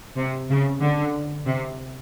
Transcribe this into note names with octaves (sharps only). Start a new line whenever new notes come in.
C3
C#3
D3
C3